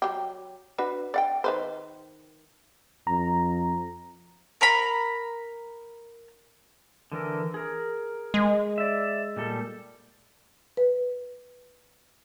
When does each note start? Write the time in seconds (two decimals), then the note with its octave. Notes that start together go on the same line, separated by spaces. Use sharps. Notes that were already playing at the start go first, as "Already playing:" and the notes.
0.02 F#3 G4
0.78 D4 F#4 B4
1.14 D5 F#5 G5
1.44 D#3 B4 C5
3.07 F2 A#5
4.61 A#4 A#5 B5
7.12 D3 E3 A#4
7.54 G#4 A#4
8.34 G#3
8.78 D5 E5
9.36 A#2 G3 A4
10.77 B4